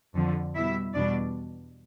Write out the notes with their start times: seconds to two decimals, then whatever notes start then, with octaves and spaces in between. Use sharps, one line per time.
0.15 F2 D3 F3
0.55 B2 G3 E4 E5
0.94 E2 B2 G3 D4 D5